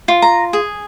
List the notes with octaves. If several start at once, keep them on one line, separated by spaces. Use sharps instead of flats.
F4
A#5
G#4